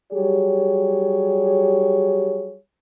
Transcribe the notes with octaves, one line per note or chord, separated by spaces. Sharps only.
F#3 G3 G4 G#4 C#5